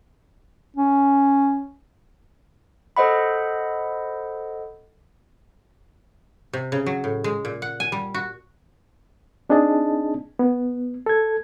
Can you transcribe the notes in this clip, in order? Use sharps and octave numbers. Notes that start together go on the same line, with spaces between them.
C#4
A4 C5 D#5 F#5 B5
C3
C#3
F#3
A2
G#3
A#2
F#5
G#5
G3
F#4
C4 D4 D#4 G#4 D#5 A5
B3
A4 G#6